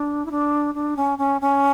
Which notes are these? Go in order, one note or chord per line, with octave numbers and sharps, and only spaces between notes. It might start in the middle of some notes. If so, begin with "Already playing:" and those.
Already playing: D4
E4
D4
D4
C#4
C#4
C#4